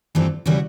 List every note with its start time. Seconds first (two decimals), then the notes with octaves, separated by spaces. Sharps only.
0.15 G2 E3 A3 C4 F4
0.46 C#3 E3 G3 F#4